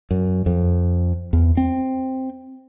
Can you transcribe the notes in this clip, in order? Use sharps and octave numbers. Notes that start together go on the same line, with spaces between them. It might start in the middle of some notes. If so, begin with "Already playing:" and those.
F#2
F2
E2
C4